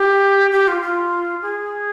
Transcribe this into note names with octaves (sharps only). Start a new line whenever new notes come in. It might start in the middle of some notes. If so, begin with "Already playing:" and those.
Already playing: G4
G4
F4
F4
G#4